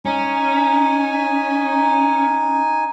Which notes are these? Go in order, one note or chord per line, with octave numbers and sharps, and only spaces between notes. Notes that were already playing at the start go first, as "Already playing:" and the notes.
C#4 D#4 G#5